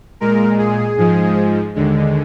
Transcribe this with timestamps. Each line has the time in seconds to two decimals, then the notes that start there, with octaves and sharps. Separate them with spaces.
0.20 A#2 G#3 A#4
0.58 G#4
0.97 G#2 F3 G#3
1.75 D#2 D3 G#3